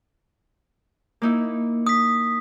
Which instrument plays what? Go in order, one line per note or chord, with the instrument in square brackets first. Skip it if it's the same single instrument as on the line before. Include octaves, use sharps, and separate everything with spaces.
[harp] A#3 D#4 E4
[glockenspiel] D#6 B6